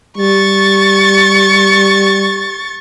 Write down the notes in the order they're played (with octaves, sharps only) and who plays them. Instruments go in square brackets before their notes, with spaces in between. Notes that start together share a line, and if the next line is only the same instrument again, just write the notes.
[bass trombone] G3 [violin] C#6 A6